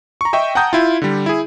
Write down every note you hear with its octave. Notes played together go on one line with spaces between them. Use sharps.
A#5 C#6
D#5 E5 G5 C#6
F#5 G5 A5 A#5 D#6 G6
E4 F4
D3 G3
E4 G#4